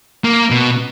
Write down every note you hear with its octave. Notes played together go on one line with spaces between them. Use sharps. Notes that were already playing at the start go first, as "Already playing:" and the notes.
A#3
B2